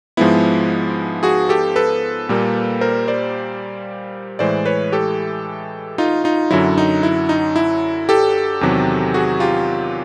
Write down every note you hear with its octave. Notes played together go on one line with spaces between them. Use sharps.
G#2 F3 G#3 B3 E4
F#4 G#4
G4 A4
A4 B4
A#2 G3 A#3
A#4 C5
C5 D5
A2 E3 G#3 C5 D5
B4 C#5
G4 A4
D#4 F4
D#4 F4
F#2 D3 F#3 E4
D#4
E4
D#4
E4
G4 A4
E2 C3 D#3 F#3
F#4 G#4
F4 G4